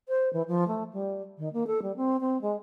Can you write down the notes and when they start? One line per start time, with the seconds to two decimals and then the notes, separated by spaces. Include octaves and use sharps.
0.09 C5
0.33 E3
0.48 F3
0.68 A3
0.93 G3
1.38 D#3
1.53 A#3
1.67 A4
1.82 G3
1.96 C4
2.20 C4
2.41 G#3